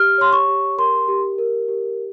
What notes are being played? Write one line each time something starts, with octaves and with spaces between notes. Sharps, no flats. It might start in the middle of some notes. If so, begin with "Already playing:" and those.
Already playing: G4 F6
C#5 C6
C#6
G4
A#4 C6
G4
A#4
G4